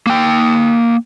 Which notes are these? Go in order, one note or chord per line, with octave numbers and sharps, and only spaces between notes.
A#3 G5